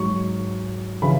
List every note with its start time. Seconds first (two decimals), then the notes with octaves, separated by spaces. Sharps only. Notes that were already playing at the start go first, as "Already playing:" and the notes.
Already playing: G#2 F#3 C#6
1.02 C#3 E3 B5